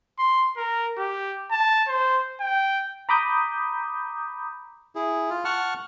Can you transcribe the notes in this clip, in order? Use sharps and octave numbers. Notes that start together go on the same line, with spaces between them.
C6
A#4
G4
A5
C5
G5
A#5 B5 D6 D#6 G6
E4 G#4
F4
F#5 A5 C#6 F6